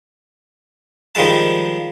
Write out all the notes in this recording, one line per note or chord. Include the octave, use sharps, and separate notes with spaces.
D#3 F3 G3 G#3 A5